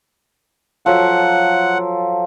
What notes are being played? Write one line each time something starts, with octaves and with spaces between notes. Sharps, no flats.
F3 F#3 A4 F#5